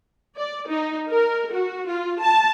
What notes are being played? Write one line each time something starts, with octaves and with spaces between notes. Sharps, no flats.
D5
D#4
A#4
F#4
F4
A5